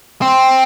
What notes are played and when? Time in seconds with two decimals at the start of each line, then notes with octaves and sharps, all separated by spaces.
0.22 C4